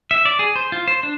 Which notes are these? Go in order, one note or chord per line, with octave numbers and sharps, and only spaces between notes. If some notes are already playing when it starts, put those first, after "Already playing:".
E5
D5
G#4
C5
F4
C5
D4